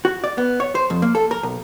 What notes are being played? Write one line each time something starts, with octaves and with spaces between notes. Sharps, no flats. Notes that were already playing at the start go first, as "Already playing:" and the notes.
F#4
D5
B3
C#5
C5
F2
A#3
A4
A#4
B1